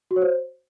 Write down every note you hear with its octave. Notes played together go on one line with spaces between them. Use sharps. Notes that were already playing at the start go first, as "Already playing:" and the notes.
F#4
C#5
C5